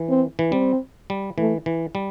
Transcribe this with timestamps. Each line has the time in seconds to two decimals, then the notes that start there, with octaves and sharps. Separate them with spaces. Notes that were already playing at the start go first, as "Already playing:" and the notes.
Already playing: E3
0.09 C4
0.39 E3
0.52 G3 C4
1.10 G3
1.38 E3 A3
1.66 E3
1.95 G3